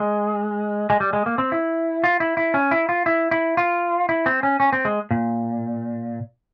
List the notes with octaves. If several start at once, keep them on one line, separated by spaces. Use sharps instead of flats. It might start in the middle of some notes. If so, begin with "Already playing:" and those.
Already playing: G#3
G#3
G3
G#3
A#3
C4
E4
F4
E4
E4
C#4
E4
F4
E4
E4
F4
E4
C4
C#4
C#4
C4
G#3
A#2